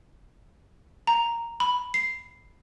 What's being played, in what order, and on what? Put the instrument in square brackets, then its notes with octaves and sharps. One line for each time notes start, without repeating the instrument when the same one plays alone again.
[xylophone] A#5
B5
C7